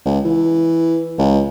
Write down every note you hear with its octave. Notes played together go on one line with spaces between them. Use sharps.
C#2
E3
C#2